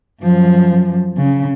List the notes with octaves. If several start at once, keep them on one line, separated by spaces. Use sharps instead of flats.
F#2 F3
C#3